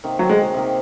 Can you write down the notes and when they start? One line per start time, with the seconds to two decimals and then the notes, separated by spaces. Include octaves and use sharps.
0.04 C3 D#3 A#3
0.19 F#3
0.29 G#3
0.54 C3 D#3 A#3